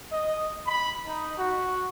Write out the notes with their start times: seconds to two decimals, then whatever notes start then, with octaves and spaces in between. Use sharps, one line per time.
0.10 D#5
0.67 B5
1.05 D#4
1.37 F#4